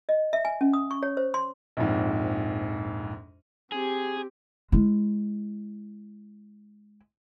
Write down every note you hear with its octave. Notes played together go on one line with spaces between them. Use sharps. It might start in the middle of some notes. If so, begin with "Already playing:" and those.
D#5
E5
G#5
C#4
D#6
C#6
C#5
C5
C6
A#1 F2 G#2
C4 G4 G#4
G#3 E4